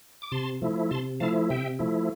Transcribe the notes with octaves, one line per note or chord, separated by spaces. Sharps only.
D6
C3 A5 C6
F3 A3 E4
C3 A5 C6
F3 A3 E4 F5 A5
C3 E5 G5
F3 A3 E4